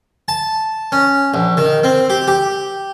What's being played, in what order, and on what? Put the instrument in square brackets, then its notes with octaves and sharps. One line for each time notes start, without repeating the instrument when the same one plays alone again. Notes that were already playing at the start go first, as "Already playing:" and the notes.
[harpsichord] A5
C#4
A#1
D#3
C4
G4
G4